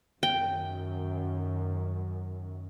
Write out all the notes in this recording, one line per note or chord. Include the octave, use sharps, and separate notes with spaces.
F#2 D#3 G5